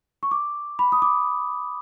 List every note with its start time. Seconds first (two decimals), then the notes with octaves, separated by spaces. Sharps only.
0.23 C#6
0.31 D6
0.79 B5
0.92 D#6
1.02 D6